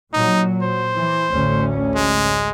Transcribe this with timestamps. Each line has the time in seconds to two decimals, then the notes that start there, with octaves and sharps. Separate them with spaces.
0.13 A#2 F#3 D#4
0.62 C5
0.97 E3
1.32 A1 D2 C#4
1.96 G#3